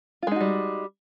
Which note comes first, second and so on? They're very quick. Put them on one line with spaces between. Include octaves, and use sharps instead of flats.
F4 G#3 D#4 F#4 G3